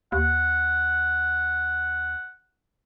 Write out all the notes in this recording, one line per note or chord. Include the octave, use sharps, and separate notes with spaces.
D#2 F#5